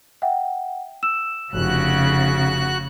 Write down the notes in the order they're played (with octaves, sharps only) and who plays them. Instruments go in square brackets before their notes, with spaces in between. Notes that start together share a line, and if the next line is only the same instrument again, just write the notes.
[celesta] E5 F#5 G5
E6 E7
[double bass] F1 [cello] C#3 [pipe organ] F#4 F#6